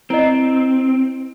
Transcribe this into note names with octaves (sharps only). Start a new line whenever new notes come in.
C4 E4 D#5